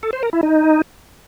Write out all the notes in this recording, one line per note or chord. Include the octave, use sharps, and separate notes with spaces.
A4
C5
A#4
E4
D#4